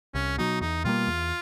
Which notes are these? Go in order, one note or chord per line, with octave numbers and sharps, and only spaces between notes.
C2 C#4
B2 F#3 D#4
E2 D#4
B2 G3 A#3 F4
E2